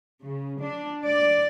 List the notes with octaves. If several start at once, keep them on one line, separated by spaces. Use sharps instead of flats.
C#3
D4
D5